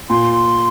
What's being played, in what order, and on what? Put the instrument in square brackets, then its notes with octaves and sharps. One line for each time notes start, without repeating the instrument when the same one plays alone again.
[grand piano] A#2 [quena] C6